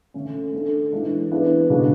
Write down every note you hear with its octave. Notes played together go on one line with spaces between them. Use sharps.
D3 A3 C#4
A3 D4 A4
E3 G#3 D4
E3 B3 D4 G#4 B4
C#3 G#3 D4 F#4